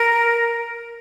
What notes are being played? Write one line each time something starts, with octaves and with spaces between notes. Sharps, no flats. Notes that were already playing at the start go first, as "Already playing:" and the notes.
Already playing: A#4